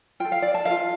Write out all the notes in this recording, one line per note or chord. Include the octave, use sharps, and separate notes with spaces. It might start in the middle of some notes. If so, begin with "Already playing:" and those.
F4 A4 G5
F5
D5
A5
F4 A#4 F5